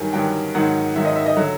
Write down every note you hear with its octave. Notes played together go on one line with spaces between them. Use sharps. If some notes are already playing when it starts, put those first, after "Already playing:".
Already playing: G2 D#3 F#3 G#5
G2 D#3 F#3 G5
G#2 D#3 F#3 F#5
G#2 D#3 F#3 E5
D#5
E5
D#5
D3 F#3